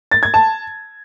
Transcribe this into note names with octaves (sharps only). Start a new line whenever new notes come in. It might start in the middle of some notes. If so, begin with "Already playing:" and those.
A6
G#6
A5